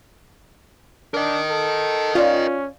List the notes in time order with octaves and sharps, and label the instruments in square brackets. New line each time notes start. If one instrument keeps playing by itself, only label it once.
[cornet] D4 [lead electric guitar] A#4 D#5
[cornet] A4
[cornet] C#4 [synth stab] F4 D5